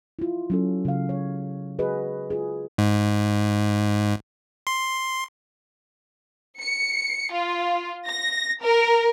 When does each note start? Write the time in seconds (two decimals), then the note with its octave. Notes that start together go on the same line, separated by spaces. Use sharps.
0.19 E4 F4
0.50 F#3 C#4 A4
0.85 C#3 F5
1.09 C#5
1.79 F#4 G#4 B4 D#5
2.30 F4 G#4
2.78 G#2
4.67 C6
6.60 C#7
7.32 F4
8.08 A#6
8.61 A#4